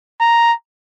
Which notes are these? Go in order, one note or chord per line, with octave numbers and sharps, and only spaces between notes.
A#5